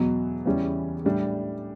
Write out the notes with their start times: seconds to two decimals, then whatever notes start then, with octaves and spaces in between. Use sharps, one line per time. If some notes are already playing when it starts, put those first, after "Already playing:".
Already playing: E2 B2 F#3
0.46 E2 C#3 E3 G3 C#4
1.05 A2 G3 D4